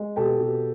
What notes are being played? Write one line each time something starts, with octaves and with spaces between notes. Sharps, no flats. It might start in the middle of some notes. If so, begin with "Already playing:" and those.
Already playing: G#3
B2 G4 A4
B2